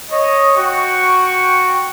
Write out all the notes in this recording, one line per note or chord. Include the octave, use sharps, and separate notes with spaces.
C#5 D#5
F#4 G5 C#6